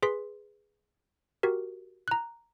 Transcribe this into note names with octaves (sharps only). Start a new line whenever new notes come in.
G#4 B4 C6 B6
F#4 G4 A#4
A#5 F#6